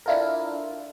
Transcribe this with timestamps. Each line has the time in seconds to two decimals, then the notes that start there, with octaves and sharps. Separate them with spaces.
0.06 D4 E4 F4 A4 A#4